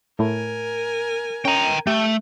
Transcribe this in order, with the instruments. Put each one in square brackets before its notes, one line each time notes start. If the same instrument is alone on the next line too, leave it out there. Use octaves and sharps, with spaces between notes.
[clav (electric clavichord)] A2 A3 E4 [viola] A#4 G#5
[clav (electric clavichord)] C#4 [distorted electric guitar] G5 A#5
[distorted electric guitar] A3 [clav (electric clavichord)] G4